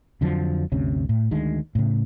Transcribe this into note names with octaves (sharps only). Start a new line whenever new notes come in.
F2 D3 F3 F#3
G1 D2 C3 C#4
A2
D2 D#3 G#3 D4
A2 C#3